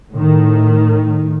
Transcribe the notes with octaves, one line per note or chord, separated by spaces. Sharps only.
A2 D#3